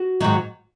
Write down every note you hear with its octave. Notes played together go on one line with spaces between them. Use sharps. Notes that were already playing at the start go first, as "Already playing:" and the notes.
Already playing: F#4
G#2 D#3 F#3